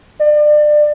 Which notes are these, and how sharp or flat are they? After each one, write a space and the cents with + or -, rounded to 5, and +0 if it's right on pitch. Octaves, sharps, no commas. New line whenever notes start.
D5 +25